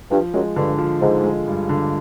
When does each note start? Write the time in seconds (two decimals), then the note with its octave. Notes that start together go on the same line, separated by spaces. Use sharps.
0.11 G2 F3
0.34 F#2 G#3
0.56 G2 D3
0.78 F3
1.01 G#2 D3
1.24 G#3
1.47 G2
1.69 D3